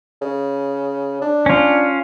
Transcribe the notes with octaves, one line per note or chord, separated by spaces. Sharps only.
C#3
D4
C#4 F4